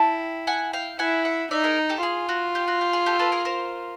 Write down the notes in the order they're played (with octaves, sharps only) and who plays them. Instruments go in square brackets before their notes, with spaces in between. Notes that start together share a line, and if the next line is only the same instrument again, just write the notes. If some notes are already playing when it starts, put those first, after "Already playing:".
Already playing: [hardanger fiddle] E4 [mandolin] G5 A5
[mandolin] F#5 G#5
F5 G5
[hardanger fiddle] E4 [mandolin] F#5 G#5
[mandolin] E5 F#5
[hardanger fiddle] D#4 [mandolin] D5 E5
[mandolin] G#4 A#4
G4 A4
[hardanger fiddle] F4 [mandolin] G#4
[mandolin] F#4
G4
F#4
G4
G#4
G4 A4
A4 B4
G#4 A#4
A#4 C5